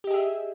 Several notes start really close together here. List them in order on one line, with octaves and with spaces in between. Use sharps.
G4 D#5 G#4 E5